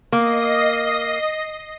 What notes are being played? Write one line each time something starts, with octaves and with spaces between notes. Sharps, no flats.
A#3 D#5 A#6 C7